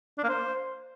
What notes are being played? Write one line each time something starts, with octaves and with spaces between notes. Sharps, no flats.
D4
A#3
C5